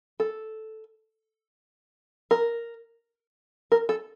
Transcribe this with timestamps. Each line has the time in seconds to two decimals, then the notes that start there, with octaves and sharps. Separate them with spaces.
0.20 A4
2.31 A#4
3.72 A#4
3.89 A4